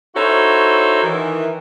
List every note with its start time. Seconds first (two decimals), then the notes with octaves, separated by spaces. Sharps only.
0.15 D#4 E4 F#4 A4 C5 C#5
1.03 D#3 E3